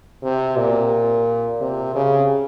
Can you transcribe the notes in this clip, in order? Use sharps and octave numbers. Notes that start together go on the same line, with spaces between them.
C3
A#2
C3
C#3